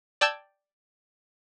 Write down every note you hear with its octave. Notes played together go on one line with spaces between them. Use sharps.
D5 G5 A5 E6 G#6